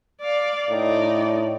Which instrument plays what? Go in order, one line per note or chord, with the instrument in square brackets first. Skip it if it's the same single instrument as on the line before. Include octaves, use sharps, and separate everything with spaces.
[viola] D5 F5
[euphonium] A2 [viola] D#4 D5